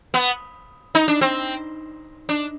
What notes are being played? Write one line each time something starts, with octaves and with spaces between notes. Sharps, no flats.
B3
D#4
D4
C4
D4